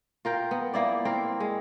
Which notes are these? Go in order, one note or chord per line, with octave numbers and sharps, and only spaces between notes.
F4 A#4 G5
B3
A#3 E4 D5
C4 A#4
G#3